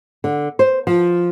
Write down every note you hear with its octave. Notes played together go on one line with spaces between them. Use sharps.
D3
C5
F3